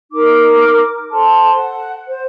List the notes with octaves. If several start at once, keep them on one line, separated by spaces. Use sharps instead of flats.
D#4 A#4 D6
A4 C5 A5 C6
F#5
C5